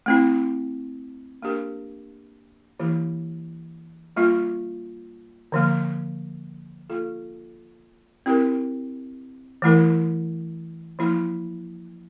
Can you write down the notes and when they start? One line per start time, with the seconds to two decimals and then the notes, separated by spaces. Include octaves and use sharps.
0.06 A3 C4 E4
1.42 A#3 D4 G4 A#4
2.79 E3 A#3 E4 G4
4.16 G3 A#3 F4
5.52 D3 F3 A#3
6.90 A#3 F4 A4
8.26 C4 E4 G4 A#4
9.62 E3 A3 E4 A#4
10.99 F3 A#3 E4